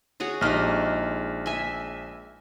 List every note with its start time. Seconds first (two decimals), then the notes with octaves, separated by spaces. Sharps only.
0.20 F#4 G#4 C#5
0.41 A#1 G#3 D#4 G4 F6
1.46 E5 G#5